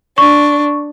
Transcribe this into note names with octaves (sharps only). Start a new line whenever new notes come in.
D4 C#6